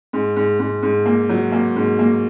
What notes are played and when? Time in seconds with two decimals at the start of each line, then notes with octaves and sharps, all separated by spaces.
0.13 G#2
0.36 G#2
0.59 G#2
0.83 G#2
1.06 A#3
1.29 F#3
1.52 A#3
1.76 G#2
1.99 A#3